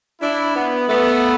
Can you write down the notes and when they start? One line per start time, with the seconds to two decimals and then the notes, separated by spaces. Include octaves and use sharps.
0.21 D4 E4
0.56 B3
0.89 A3 B3